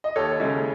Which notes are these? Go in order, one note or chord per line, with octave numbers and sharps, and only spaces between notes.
D#5
D#2 A4 C#5
C#3 G#3 C#4 E4